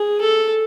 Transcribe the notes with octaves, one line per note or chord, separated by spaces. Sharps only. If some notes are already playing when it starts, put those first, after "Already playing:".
Already playing: G#4
A4